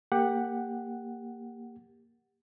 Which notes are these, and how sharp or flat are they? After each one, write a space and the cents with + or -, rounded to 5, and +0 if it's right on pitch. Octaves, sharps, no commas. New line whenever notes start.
A#3 -5 G4 +15 F#5 +0